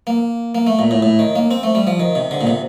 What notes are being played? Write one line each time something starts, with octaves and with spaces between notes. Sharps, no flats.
A#3
A#3
A3
A#2
A2
A2
D#3
A#3
C4
A3
G3
F3
D#3
C3
D3
A#2
C3